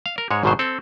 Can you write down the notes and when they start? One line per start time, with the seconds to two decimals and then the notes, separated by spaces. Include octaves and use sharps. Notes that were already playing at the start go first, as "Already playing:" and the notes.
0.06 F5
0.18 A#4
0.31 G#2 G#3 C#5
0.43 G#1 G#2 B2 D#3 F#3 C5
0.59 C4 A4